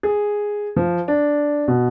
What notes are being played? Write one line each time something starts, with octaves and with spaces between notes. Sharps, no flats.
G#4
F3
D4
B2